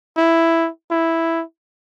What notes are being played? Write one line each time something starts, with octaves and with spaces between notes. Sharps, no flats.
E4
E4